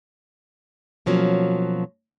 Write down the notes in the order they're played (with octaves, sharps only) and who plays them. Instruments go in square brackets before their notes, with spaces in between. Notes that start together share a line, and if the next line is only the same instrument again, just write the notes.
[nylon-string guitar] B2 F3 F#3 A#3 C#4